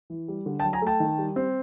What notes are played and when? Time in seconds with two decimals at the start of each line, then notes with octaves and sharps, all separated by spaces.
0.10 E3
0.28 G3
0.46 D3
0.59 G5 A5
0.64 F#3
0.73 G#5 A#5
0.82 A3 G5 A5
1.00 D#3
1.18 G3
1.36 C4